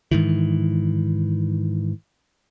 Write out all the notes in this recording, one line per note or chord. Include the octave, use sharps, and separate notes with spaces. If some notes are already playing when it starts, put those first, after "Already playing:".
G#2 D#3 E3